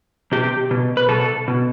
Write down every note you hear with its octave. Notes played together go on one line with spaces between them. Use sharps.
B2 G4
B2
B4
B2 A4
B2